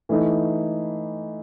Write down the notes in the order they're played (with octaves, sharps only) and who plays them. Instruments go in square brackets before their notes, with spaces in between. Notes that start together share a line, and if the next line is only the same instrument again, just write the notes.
[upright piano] E3 A3 D#4